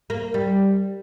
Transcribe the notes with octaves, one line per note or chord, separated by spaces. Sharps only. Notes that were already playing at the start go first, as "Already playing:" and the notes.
A#3
G3